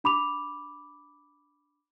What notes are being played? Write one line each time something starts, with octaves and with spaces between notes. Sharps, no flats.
D4 B5 D6 F7